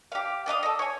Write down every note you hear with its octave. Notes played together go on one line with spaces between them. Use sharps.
G4 F5
D5 D#5 F5 D#6
A4 D#5
C#5 G#5